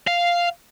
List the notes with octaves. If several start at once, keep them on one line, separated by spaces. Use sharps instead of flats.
F5